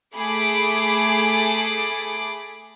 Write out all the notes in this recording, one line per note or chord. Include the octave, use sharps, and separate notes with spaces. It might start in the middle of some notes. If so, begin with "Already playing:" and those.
A3 G#4 B5 D6